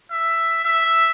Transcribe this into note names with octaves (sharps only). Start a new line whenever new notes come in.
E5
E5